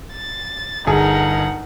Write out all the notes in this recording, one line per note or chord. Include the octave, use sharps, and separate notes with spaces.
A6
G1 D#4 G#4 A#4 F#5